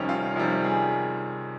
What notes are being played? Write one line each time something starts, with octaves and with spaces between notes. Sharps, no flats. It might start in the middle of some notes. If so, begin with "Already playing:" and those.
Already playing: F2 C3 D#3 G3 C#4
F4
F2 C3 D#3 G3
G#4